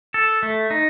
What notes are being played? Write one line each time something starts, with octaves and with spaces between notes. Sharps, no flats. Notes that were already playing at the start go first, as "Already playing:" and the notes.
A4
A3
D#4